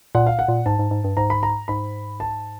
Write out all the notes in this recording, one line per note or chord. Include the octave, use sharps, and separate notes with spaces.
A#2 F#5
F5
F#5
A#2
G#2 A5
G#2
G#2
G2
G#2 A#5
B5
A#5
G#2 B5
A5